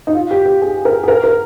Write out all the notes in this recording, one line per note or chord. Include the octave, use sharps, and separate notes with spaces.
D#4
F4
G4
G4
G#4
A#4
G#4
A#4
A#4